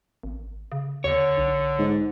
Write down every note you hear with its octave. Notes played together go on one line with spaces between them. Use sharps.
G#1
C#3
D#2 D3 C#5
B1
G#2